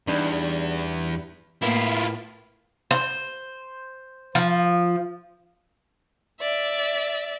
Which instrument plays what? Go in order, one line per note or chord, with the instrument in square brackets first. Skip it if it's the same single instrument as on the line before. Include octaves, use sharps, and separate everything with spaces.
[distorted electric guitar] E2 [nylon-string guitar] G3 D4 D#4
[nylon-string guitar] A2 A#3 B3 [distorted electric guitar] E4 F4
[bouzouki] C5
F3
[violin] D5 E5